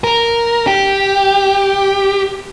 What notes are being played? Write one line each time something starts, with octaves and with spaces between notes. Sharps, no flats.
A#4
G4